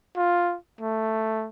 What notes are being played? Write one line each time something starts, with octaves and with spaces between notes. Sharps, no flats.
F4
A3